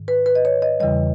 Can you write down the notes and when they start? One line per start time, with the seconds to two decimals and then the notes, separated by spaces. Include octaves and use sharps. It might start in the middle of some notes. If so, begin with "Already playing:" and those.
Already playing: G#2 D#3
0.08 B4
0.26 B4
0.35 D#5
0.45 C#5
0.62 D#5
0.80 E2 C#3 E3 G3 D#5